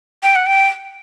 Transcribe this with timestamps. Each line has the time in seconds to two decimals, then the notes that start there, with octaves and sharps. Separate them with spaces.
0.23 G5
0.36 F#5
0.46 G5